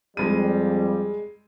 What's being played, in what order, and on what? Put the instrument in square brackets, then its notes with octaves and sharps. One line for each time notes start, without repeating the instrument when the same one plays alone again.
[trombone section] F2 G3 [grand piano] G#3 D#7